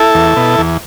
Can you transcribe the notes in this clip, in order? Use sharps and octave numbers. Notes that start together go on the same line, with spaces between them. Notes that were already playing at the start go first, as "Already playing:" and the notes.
Already playing: E4 A4
E2
B2
E2